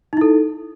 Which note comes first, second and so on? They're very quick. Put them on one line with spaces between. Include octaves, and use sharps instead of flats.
D#4 E4 A4